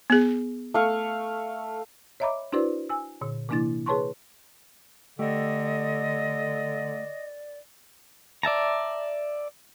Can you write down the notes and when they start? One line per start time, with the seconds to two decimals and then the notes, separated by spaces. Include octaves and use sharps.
0.10 B3 G#4
0.74 A3 F5 C#6
2.20 C#5 D#5 E5 A#5 B5 D6
2.53 D4 E4 F#4 B4 C5 D5
2.89 G#5 E6
3.21 A#2 D3
3.49 C3 E3 A#3 D4 E4 A6
3.86 G#4 B4 C#5 A5 C6 C#6
5.19 D3 A3 G4 D5 D#5
8.43 D5 E5 A5 A#5